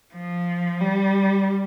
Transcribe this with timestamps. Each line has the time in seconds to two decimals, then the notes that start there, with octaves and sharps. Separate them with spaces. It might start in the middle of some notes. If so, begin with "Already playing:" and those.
0.14 F3
0.80 G3